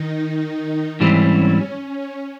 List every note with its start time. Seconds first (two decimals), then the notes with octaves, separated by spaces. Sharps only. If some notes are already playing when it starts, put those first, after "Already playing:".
Already playing: D#3 D#4
1.00 G#2 E3 G3 C4 C#4
1.83 C#4